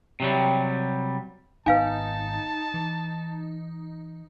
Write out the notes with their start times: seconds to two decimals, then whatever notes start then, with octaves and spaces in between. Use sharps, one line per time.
0.20 C3 F#3 G3
1.66 G#1 B3 D#4 B4 F5 G#5 A5
2.74 E3